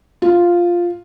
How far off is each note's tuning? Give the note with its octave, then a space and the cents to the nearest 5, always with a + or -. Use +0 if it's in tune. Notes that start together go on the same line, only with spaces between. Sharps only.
F4 +0